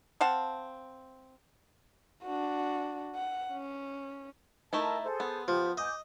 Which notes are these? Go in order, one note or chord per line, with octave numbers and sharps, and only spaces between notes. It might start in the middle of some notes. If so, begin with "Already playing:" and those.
C4 F5 F#5 A5
D4 F#4
F#5
C#4
A3 D#4 E4 A#4 A5
G#4 A4 C5
B3
F3 G4
D#5 G#5 D6 G6